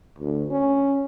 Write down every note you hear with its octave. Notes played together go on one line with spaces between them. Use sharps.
D2
C#4